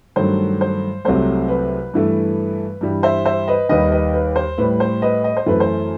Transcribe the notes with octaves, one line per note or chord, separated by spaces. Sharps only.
G2 D#3 F#3 A3 C5
C5
C2 C3 F#3 A3 C5
B4
G2 E3 A3
G2 E3 G3
C5 E5
C5 E5
B4 D#5
D#2 D#3 G3 B4 D#5
B4 D#5
B4
C5
A2 G3 B4
C5
B4 D#5
D#5
C5
F#2 E3 A3 B4
C5